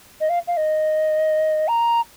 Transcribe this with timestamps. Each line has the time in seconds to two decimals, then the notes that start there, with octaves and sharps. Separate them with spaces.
0.21 D#5
0.29 F5
0.47 F5
0.57 D#5
1.68 A#5